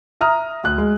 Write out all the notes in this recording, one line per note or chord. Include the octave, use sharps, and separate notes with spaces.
E5 A#5 D#6 F6
D2 F#6
G#3